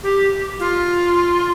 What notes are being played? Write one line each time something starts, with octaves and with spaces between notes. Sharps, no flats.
G4
F4